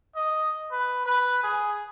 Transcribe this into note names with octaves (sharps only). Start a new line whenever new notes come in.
D#5
B4
B4
G#4